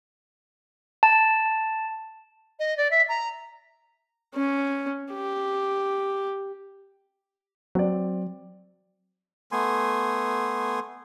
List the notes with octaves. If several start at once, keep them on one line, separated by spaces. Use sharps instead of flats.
A5
D#5
D5
E5
A#5
C#4
G4
F#3 C4 D5
A3 B3 G#5 C6